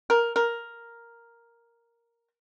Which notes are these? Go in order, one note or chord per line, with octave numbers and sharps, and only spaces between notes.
A#4
A#4